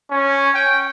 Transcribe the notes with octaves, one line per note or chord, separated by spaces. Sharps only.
C#4
G5